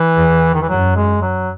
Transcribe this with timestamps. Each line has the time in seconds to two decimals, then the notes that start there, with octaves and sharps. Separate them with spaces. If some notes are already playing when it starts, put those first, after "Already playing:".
Already playing: E3
0.16 E2
0.54 D#3
0.62 E3
0.69 F#2 F#3
0.96 G#3
1.22 F#3